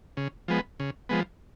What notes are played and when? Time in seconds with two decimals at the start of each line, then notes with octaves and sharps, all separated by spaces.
0.17 C#3
0.48 F3 G#3 B3
0.80 C#3
1.09 F3 G#3 B3